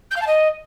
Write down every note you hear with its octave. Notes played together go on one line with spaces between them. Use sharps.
G6
F5
A5
D#5